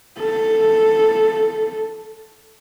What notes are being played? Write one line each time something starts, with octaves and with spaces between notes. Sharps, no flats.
A4